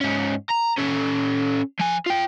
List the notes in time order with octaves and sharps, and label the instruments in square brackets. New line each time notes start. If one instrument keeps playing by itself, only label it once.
[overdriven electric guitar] G#2 C#4
A#5
C#4 A4
F3 G#5
F4 G5